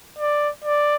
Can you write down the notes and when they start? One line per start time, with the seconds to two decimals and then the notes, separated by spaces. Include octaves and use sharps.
0.19 D5
0.64 D5